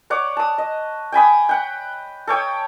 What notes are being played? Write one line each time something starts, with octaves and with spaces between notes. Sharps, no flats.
C#5 D5 F#5
A5 D#6
D#5
G5 G#5 B5 D#6
F#5 G5
A4 C#5 G5 D#6